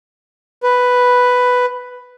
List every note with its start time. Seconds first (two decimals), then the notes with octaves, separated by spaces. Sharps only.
0.63 B4